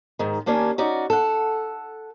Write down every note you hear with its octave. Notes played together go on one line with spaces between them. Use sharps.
G#2 D#3
D#2 A#3 C#4 D4 G#5
C#4 D#4 F#4 D5
A4 F#5